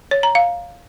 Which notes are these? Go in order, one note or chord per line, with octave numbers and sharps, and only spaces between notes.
C#5
A#5
F5